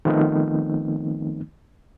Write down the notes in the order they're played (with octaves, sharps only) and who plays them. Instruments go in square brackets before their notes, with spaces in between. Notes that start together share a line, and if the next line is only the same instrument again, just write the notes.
[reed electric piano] D#3 F3 A3 B3 C4 D#4